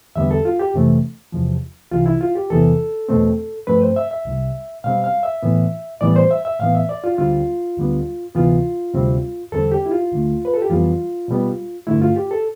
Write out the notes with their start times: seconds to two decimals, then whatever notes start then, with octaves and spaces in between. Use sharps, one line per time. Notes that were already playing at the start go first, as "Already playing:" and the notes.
0.16 E2 D3 G3 B3 E5
0.31 A4
0.45 F4
0.59 G4
0.74 F2 C3 E3 A3
1.32 E2 C3 F3
1.91 C2 C3 E3 F4
2.06 E4
2.21 F4
2.35 G4
2.50 E2 C3 E3 B3 A4
3.09 E2 B2 A3 C4
3.67 G2 F3 A3 C4 B4
3.82 C5
3.96 E5
4.11 E5
4.25 C2 C3 G3
4.84 B2 G3 C4 F5
5.04 F5
5.23 E5
5.43 A2 E3 B3
6.01 A2 E3 G3 B3 D5
6.16 C5
6.31 E5
6.45 E5
6.60 A2 E3 B3 F5
6.75 E5
6.89 D5
7.04 F4
7.18 D2 D3 G3 C4 F4
7.77 D2 D3 G3 B3
8.35 D2 C3 E3 B3 F4
8.94 D2 C3 G3 C4
9.52 E2 D3 G3 C4 A4
9.72 G4
9.86 E4
9.91 F4
10.11 D2 D3 A3
10.45 B4
10.54 A4
10.62 G4
10.69 F2 E3 G3 B3 F4
11.28 B2 G3 B3
11.87 G2 D3 A3 E4
12.01 F4
12.16 G4
12.31 A4